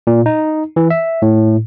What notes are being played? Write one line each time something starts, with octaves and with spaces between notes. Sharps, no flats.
A#2
D#4
E3
E5
A2